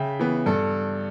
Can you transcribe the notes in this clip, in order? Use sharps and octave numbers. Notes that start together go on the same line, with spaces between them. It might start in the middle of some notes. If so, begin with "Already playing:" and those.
Already playing: C#3 E5 G5
E3 B3
G2 A4